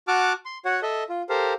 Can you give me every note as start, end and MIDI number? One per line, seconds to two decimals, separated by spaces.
0.08 0.33 66
0.08 0.33 78
0.08 0.33 81
0.08 0.33 86
0.08 0.33 89
0.45 0.58 84
0.65 0.80 66
0.65 0.80 73
0.65 0.80 78
0.82 1.03 69
0.82 1.03 75
0.82 1.03 76
1.09 1.22 65
1.29 1.53 67
1.29 1.53 69
1.29 1.53 70
1.29 1.53 72
1.29 1.53 77